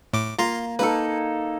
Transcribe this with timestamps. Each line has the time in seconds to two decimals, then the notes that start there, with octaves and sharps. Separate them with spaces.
0.13 A2 D6
0.39 A#3 F4 A#5 C6
0.79 A#3 D#4 A4 B4